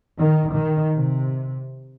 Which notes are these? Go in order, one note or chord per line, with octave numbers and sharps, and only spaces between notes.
D#3
D#3
C3